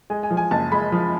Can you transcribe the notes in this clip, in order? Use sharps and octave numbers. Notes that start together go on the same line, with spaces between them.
G#3 G#5
G#5
F3
G#5
F#1 A5
G#3 B5
F3